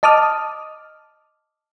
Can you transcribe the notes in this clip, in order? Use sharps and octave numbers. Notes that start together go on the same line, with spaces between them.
D#5 A5 D6 D#6 F6